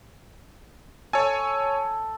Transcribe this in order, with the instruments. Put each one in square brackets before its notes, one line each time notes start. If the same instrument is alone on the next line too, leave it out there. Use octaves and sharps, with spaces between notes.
[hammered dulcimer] A4 [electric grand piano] C#5 G#5